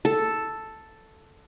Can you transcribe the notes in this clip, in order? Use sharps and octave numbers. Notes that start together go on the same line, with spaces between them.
A4